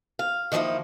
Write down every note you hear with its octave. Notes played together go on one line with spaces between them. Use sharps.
F5
D#3 F3 A#3 D#4 E4